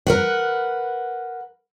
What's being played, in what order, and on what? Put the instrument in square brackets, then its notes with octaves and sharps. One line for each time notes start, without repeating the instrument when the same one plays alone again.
[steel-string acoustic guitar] A#4 B4 F#5